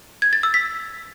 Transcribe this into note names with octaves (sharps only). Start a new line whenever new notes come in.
G#6
A6
E6
B6